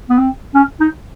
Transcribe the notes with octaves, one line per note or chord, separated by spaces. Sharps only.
B3
C4
C#4
D#4